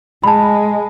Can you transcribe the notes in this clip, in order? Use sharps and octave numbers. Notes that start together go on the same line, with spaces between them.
G#3 A5 B5